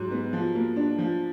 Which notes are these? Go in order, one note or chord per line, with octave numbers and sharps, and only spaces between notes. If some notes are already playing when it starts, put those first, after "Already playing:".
Already playing: G#2 F#3
B3
F3
A#3
D4
F3